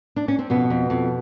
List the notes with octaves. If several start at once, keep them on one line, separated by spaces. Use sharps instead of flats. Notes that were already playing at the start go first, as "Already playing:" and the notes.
D4
C#4
C4
F2 B2 B3
F2
F2